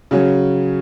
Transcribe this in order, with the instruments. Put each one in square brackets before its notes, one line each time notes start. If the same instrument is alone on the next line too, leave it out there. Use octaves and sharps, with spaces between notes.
[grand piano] C#3 F#3 C#4